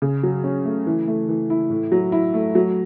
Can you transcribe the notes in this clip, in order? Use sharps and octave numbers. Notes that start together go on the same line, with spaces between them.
C#3
F#3
C#4
A3
E3
A3
E3
E4
A2
F#3
E4
A3
F#3